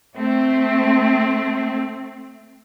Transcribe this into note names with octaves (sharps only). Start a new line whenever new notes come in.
A3 C4